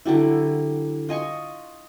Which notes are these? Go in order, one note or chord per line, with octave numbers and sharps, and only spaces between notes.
D3 F#3 G3 E4
F4 D#5 G#5 C#6